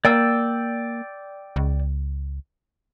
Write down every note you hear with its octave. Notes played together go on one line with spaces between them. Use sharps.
A#3 D5 G5 E6
C#2